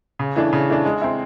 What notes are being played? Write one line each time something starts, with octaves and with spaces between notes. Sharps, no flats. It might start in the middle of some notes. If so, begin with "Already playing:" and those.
C#3
E3 A3 D4
C#3
E3 A3 D4
G#3
C4 E4